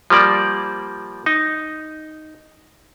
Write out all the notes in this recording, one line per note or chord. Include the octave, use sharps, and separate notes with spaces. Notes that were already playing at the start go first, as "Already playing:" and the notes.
F3 G3 A#3 D5
D#4